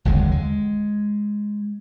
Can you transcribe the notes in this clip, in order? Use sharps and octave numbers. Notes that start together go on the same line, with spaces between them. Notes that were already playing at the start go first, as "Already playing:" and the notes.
F#1 D#2 D3 G#3
G#3